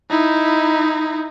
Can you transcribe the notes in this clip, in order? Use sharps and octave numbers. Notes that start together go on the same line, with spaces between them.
D#4 E4